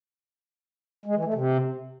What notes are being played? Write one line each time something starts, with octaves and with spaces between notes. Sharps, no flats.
G#3
E3
A3
C3